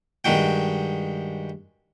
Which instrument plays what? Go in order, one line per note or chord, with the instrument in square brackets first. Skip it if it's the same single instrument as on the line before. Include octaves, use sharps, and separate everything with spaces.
[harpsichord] G2 D#3 G#3 F#4 G5